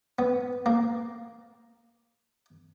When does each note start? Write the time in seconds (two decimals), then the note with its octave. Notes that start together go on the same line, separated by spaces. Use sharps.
0.19 B3
0.66 A#3